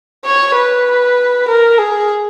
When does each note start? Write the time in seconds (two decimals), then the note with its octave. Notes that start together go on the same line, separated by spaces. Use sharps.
0.25 C#5
0.56 B4
1.48 A#4
1.79 G#4